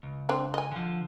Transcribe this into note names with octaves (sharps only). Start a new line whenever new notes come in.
C#2
C4 D4
D#5 G#5
D3 F3